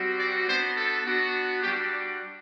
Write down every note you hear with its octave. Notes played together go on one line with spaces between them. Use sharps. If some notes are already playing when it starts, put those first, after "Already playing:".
Already playing: G3 C4 F#4
D5
B3 D4 F#4 C5
A4
B3 D4 F#4
G3 D4 F#4 G4